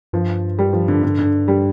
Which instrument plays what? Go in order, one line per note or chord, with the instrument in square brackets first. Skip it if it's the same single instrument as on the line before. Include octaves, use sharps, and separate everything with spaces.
[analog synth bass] G2 [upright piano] F3
[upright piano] G3
F3
D3
D3
D3
G3